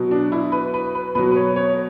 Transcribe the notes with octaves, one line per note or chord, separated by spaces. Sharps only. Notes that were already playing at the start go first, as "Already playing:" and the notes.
Already playing: B2 F#3
D4
E4
B4
B4
B4
B2 F#3 B4
B4
C#5
C#5